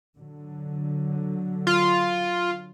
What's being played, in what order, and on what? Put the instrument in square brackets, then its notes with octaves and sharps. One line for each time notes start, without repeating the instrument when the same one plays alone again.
[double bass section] D3 F#3
[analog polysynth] F4